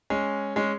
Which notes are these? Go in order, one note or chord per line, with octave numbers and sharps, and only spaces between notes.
G#3 C#4
G#3 C#4